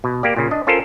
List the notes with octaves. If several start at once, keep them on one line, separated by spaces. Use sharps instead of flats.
B2
A#3 G4 D5
A#2 C#3
D4 D#5
C#4 F4 A4 A#4 C5